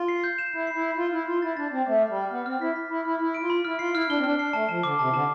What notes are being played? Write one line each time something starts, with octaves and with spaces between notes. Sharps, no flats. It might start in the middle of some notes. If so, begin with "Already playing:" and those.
Already playing: F4
C7
G6
E7
E4 E7
C7
E4
E7
F4 C7
E4 F6
F4 F6
E4 A6
D4 A6
C4 A6
A3 D6
F6
G3
F6
B3 F6
C4 F6
E4 B6
B6
E4 B5
E4 F6
E4 F6
D7
F4
B5
E4 F6
F4 C7
E4 F6
D4 G7
C4
D4 F6
D4 C7
A3 A5
F3 A5
D3 D6
C3 A5
E3
D3 A5